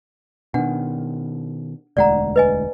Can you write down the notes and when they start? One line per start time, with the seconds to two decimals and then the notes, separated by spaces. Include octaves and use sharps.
0.54 B2 D#3 D4 F#5
1.97 E1 D2 G#3 D5 F#5 A#5
2.36 B4 D#5 G#5